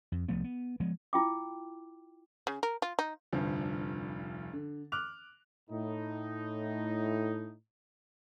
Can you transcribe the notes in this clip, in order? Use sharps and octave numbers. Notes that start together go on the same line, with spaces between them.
F2
C2 F3 A3 B3
B3
F3 G#3 B3
E4 F4 G5 D6
C#3
A#4
F4
D#4
F1 D2 G2 F3
D3
D6 F6 F#6 F7
A2 D#4